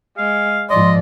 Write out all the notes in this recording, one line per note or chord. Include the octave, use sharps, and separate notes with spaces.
G#3 F5
G#2 F3 D5 D#5 C6